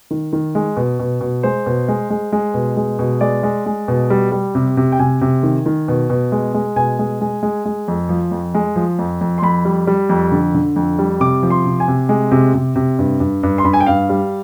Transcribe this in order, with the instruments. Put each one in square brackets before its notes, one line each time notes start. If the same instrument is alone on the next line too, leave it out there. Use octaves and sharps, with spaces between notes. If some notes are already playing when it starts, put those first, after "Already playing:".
[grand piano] D#3
D#3
G#3
B2
B2
B2
G#3 C5
B2
G#3
G#3
G#3
B2
G#3
B2
G#3 D5
G#3
G#3
B2
G3
G3
C3
C3
G5
C3 G#5
C3
D#3
D#3
B2
B2
G#3
G#3
B2 G#5
G#3
G#3
G#3
G#3
F2
F3
F2
G#3
F3
F2
F2
C6
F2 B5
G3
G3
F2
D3
D3
F2
G3
C3 D6
F3
C6
C3
G#5
C3
G#3
C3
C3
C3
G2
G2
G2
C6
G2 B5
G#5
G5
G2 F5
G3